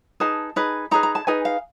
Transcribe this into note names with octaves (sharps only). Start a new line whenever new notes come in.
D#4 G#4 B4 A5
D#4 G#4 B4
D#4 G#4 B4 A#5
A#5
A5
D#4 G#4 B4 G#5
F5